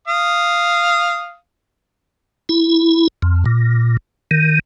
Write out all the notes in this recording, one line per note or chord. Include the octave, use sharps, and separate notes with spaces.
F5 D#6
E4
F2
A#2
D#3